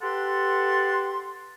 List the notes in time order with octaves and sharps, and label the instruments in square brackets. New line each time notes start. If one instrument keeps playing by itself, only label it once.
[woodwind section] G4 A4 B4 F#5 A5 C6